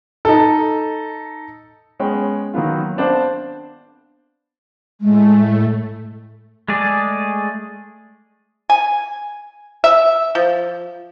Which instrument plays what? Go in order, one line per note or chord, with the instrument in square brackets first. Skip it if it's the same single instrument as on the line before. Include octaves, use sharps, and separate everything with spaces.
[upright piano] D#4 A4
[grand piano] G#3 B3 C#4 G5
D#3 F#3 A#3 B3 F4
B3 C4 D4 C5 F5
[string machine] A2 A3 [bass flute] G#3
[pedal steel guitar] G#3 A3 G#4 D5
[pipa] G#5
E5
F3